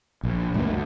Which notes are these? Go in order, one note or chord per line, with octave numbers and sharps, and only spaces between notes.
A#1
D2 G2 F#3 A#3
D2